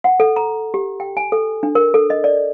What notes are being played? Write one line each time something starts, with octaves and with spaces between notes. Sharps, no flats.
F#5
A4
A#5
G4
G5
G#5
A4
D4
A#4
A4
D#5
D5